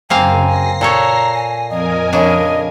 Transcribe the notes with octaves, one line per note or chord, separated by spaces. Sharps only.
F#2 C#3 A#3 C4 F5 G#5
A#6 C7
A#2 A4 C#5 A#5
G#5
F2 A#4 D#5 G#5
C#3 D4 D#5